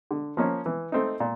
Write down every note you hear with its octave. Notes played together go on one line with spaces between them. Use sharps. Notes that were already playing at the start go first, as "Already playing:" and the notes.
D3
F3 A#3 C#4
E3
A3 C4 D#4
A#2